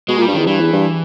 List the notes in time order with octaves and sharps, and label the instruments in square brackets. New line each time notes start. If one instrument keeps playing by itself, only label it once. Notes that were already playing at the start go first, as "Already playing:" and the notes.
[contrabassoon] B2 [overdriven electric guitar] G#3
[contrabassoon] A#2 [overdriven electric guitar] G3
[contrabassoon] G2
[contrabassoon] E2 [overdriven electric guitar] D#3
[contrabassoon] G2 [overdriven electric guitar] E3
[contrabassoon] E2
G2